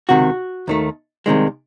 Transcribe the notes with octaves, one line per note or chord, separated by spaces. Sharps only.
C#2 C3 D#3 F#4
D#2 D#3 A3
C2 C3 D#3 G#3